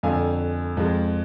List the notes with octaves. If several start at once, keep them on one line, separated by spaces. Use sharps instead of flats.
F2 D3 F3 F5 G#5
F2 F3 G#3